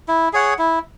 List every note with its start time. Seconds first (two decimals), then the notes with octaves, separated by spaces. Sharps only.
0.08 E4
0.33 G#4 C#5 F#5
0.59 E4